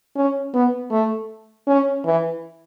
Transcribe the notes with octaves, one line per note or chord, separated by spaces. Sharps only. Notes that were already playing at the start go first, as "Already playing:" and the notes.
C#4
B3
A3
C#4
E3